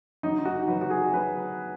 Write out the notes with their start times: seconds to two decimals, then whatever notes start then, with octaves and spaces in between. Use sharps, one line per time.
0.23 F#3 D#4
0.39 D#4
0.45 F#4
0.68 F#3 B4
0.81 F#4
0.90 G#4
1.13 F#3 B4